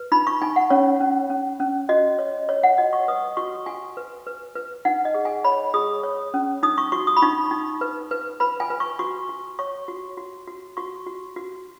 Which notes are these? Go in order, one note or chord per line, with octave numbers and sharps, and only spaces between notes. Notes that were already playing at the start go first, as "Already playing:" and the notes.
Already playing: B4
D#4 B5
C#6
D#4 G#5
F#5
C#4 C#5
C#4
C#4
C#4
F#4 D#5
C#5
C#5
F#5
F#4 D#5
C#6
B4 D#6
F#4 C#6
F#4 G#5
B4
B4
B4
D#4 F#5
D#5
G#4
G#5
C#5 B5
G#4 D#6
C#5
C#4
D#4 D#6
C#6
F#4 C#6
D#6
B5
D#4 C#6
D#4
B4
B4
B4 B5
G#5
B4
C#6
F#4 C#6
F#4
C#5 C#6
F#4
F#4
F#4
F#4 C#6
F#4
F#4